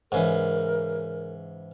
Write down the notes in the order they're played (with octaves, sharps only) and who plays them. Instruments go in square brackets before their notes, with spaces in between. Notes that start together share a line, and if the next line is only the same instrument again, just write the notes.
[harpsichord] G#2 C#3 E3 [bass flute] A#4